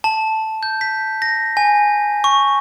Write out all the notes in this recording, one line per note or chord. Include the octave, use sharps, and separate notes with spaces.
A5
G6
B6
A#6
G#5
C#6